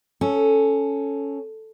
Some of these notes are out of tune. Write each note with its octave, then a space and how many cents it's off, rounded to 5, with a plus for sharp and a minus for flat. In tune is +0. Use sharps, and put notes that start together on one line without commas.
C#4 +0 A4 -5